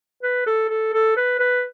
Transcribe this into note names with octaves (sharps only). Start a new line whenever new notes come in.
B4
A4
A4
A4
B4
B4